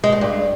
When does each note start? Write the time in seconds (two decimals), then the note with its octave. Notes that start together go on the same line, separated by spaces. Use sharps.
0.04 G#3
0.12 A2
0.21 G2